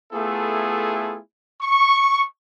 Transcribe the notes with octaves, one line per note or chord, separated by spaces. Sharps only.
A3 B3 E4 F4 G#4 A4
C#6